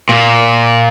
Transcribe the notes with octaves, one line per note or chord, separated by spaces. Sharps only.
A#2